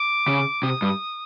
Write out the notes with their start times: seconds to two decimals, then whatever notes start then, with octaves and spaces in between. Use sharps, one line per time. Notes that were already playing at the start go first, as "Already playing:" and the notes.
Already playing: D6
0.28 C#3
0.63 C3 D#6
0.82 G2